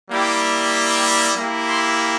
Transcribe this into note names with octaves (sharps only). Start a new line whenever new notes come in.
G3 A#3 E4 G4
A#3 E4 G4
C6